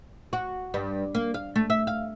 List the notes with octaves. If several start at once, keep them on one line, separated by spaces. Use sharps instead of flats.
F#4
G2
A#3
F5
A3
E5
F5